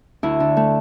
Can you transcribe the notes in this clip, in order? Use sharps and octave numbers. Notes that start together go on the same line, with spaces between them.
D2 E4
D3
A3